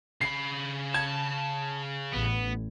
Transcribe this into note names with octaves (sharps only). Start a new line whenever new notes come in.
C#3 B5 C7
A5 G#6
A1 B3